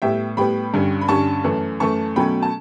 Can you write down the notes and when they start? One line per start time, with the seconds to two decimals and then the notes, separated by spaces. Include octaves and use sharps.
0.02 A2 G3 B3 E5 G5
0.37 A2 G3 B3 G5 B5
0.74 G2 D3 G3 C#4
1.01 B5
1.08 G2 D3 G3 C#4 A5 C#6
1.44 F#2 E3 A3
1.80 F#2 E3 A3 A5 C#6
2.16 B2 F#3 A3 C#4 G5 B5
2.42 A5